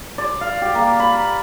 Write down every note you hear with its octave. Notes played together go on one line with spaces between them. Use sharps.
D5
F5
G4
A#3
B5